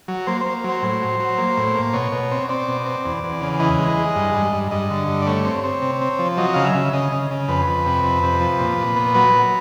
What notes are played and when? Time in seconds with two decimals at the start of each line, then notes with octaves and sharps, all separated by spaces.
0.08 F#3
0.27 A#3 C5
0.41 A#3 C5
0.64 F#3 C5
0.82 A2
1.02 F#3
1.20 F#3
1.38 A#3
1.57 A2
1.75 A#3
1.93 B2 C#5
2.12 B2
2.31 C4
2.49 C4 D5
2.68 B2
2.86 C4
3.05 E2
3.24 E2
3.41 C#3
3.60 E3 D#5
3.79 G#3
3.97 G#3
4.16 G2
4.34 G2
4.52 G2
4.71 G2 D#5
4.90 D3
5.08 G2
5.22 D5
5.26 A3 C#5
5.45 C4
5.64 C4
5.82 C3
6.01 C4
6.19 F3
6.37 F#3 D#5
6.54 C#3 F5
6.65 E5
6.75 C#3
6.93 C#3 D#5
7.12 C#3
7.31 C#3
7.48 F2 B4
7.68 F2
7.86 C3
8.04 F2
8.23 C3
8.41 F3
8.59 A#2
8.78 A#2
8.96 B3
9.14 F#3 B4
9.33 F#3